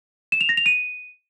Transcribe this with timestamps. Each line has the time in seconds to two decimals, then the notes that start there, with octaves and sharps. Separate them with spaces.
0.32 E7
0.41 F7
0.49 A#6
0.57 F7
0.66 D#7